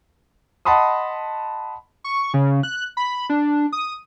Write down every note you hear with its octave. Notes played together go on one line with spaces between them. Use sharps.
D#5 F#5 A5 B5 C6 D#6
C#6
C#3
F#6
B5
D4
D#6